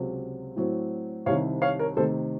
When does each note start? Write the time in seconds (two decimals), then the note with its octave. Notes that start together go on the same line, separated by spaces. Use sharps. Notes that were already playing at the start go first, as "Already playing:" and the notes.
Already playing: C#2 C3 F#3
0.56 A2 F#3 C4
1.26 C2 C3 D#3 C#5 F5
1.62 C#5 F5
1.79 A#4 C#5
1.97 C3 D#3 A3 A4 C5